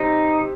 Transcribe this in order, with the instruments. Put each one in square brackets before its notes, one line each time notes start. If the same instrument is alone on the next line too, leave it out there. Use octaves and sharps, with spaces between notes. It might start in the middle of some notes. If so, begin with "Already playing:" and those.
Already playing: [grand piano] C3 G3 C4 G4 [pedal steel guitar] D#4
[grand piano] C3